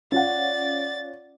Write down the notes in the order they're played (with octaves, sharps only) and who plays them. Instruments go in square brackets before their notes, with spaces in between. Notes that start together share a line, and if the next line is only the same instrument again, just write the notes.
[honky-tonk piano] C#4 F4 F#5 [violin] D5 A6